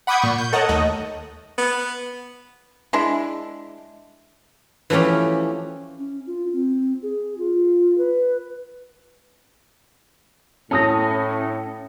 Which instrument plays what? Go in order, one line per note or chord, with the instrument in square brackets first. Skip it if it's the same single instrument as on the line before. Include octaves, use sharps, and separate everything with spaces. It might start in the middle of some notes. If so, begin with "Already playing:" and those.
[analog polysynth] F#5 B5 D6 D#6 G6 G#6
A#2 C#6
G6
A4 A#4 C#5 D#5 F#5 A5
D#2 A3 D#5
[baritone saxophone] B3
[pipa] G#3 D4 E4
[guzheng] E3 F3 A3 C#4 G4
[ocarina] C#4
F4
C4
G#4
F4
B4
[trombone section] A2 [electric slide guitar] C#4 [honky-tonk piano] A5 D#6 A#6